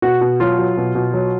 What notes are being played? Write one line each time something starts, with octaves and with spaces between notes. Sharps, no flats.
B2 F#4
B2
F#3 F4
F#3
B2
B2
F#3